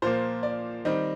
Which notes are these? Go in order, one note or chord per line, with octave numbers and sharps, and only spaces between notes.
A#2 F3 A#3 C5
D5
D#3 G3 C4 D#5